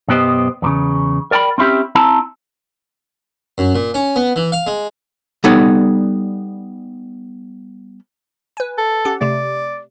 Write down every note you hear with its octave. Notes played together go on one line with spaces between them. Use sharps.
B1 F#2 B3 G4 C5 D#5
E2 A#2 C#3
A#4 D5 G5 A5 B5
C4 C#4 E4 G4
C4 E4 A5 A#5
F#2
A#2
C#4
B3
E3
F5
G#3
G3 B3 D#4 A4 C#5 D5
B4 G#5
A4
C#4 G4 F#5
C3 A3 D5